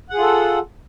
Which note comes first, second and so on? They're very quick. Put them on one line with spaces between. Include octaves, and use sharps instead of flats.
F#5 G#4 F4 A4